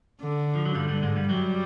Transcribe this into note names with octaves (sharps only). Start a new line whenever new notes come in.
D3
F3
F#3
G2 D3 G3
G2 G3
G#2 G#3
G2 G3
F#2 F#3 G3